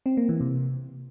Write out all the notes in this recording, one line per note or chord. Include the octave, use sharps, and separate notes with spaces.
C4
A#3
E3
C3